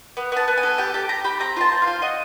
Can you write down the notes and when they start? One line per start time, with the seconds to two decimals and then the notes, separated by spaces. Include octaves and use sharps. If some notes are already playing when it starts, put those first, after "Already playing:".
0.17 B3
0.32 B3 A5
0.48 B3
0.57 G#5
0.63 A4
0.78 G4 G5
0.94 G4 A5
1.09 G4 A#5
1.24 G4 B5
1.40 C4 A#5
1.57 F4 A5
1.72 C4
1.82 F5
1.87 F4
2.02 F#4 D#5